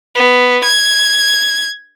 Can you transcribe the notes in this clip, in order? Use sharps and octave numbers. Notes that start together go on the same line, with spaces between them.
B3
G#6